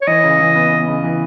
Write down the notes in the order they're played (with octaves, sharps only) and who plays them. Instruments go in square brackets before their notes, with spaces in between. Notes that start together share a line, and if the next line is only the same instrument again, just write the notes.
[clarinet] C#5
[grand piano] E3 [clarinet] D#5
[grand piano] C#3
E3
B3
B3
C#3
E3